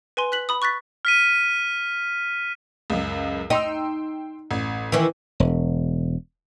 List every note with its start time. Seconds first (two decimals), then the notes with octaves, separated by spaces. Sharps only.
0.17 B4 G#5 C6
0.32 F#6 B6 F#7
0.49 B5 D#6
0.62 C#6 F#6 A6 B6
1.05 F6 B6 D#7
2.90 C#2 F#2
3.50 D#4 G5 C6 E6
4.51 A1
4.92 D#3 E3
5.40 E1